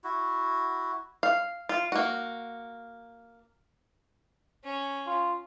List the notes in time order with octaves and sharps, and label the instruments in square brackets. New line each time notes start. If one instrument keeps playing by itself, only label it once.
[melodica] E4 F#4
[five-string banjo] F5
F4
A#3 F#4
[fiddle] C#4
[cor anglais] F4